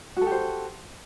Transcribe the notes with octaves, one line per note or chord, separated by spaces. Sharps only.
F#4 G4 A4 C5